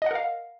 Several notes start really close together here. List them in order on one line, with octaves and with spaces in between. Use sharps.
D#5 F#5 A#4 F5